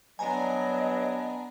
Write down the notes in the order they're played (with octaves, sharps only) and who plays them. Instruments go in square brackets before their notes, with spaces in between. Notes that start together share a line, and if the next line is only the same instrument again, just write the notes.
[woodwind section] G2 F#3 [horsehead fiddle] B3 D4 [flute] D#5 [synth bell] G#5 A#5